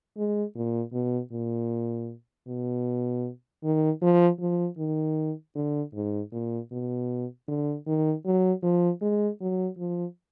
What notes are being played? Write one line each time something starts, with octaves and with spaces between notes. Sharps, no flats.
G#3
A#2
B2
A#2
B2
D#3
F3
F3
D#3
D3
G#2
A#2
B2
D3
D#3
F#3
F3
G#3
F#3
F3